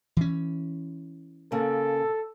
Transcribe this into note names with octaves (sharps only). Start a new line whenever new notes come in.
E3 C#4
C#3 A#3 A4